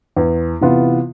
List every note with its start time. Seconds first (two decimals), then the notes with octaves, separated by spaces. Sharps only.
0.17 E2
0.61 C3 E3 B3 F4